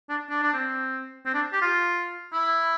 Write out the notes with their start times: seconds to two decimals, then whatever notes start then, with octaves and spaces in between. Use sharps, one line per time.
0.09 D4
0.30 D4
0.43 D4
0.54 C4
1.26 C4
1.34 D4
1.52 G4
1.62 F4
2.33 E4